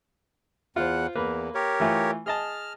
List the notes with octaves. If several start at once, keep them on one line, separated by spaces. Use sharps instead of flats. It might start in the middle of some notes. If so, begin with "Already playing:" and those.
E2 F4 C5 F#5
E2 A#3 B4
G4 A#4 C#5
E3 A3 F4
G#4 D#5 A5 F6